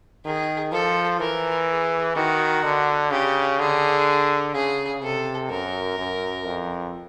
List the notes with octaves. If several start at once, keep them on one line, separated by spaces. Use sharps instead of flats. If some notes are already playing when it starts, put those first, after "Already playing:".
D#3 G#4
F3 A4
E3 A#4
G#4
D#3 F#4
D3
C#3 G4
D3 G#4
C#3 G#4
C3 A4
F#2 A#4
F#2
F2